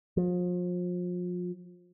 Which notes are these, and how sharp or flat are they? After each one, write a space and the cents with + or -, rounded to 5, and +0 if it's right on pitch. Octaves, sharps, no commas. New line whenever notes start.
F3 +35